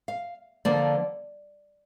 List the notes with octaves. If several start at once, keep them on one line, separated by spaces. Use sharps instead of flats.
F5
D3 F3 A#3 D5